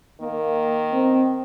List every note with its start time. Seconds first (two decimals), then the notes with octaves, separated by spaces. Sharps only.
0.21 D#3 A#3
0.91 C4